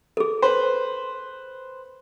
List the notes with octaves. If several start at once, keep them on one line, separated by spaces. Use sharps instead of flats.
G#4 A4
B4 C5